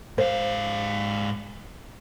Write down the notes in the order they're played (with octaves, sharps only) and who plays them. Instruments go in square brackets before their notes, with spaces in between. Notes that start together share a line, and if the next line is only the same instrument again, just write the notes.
[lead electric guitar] G#2 F5 [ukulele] C5